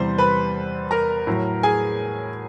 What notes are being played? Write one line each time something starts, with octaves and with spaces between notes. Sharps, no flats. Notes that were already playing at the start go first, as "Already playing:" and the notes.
Already playing: E2 C3 E3 G3 C5 C6
B4 B5
A#4 A#5
A2 F#3
G#4 G#5